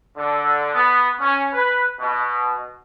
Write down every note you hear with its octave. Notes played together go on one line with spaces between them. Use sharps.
D3
B3
C#4
B4
B2